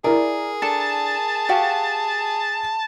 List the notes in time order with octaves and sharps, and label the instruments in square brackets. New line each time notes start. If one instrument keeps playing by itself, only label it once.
[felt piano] E4 A#4 [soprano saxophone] G#4 [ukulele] D5
[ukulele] D4 A4 [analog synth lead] A5
[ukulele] F#4 G4 F5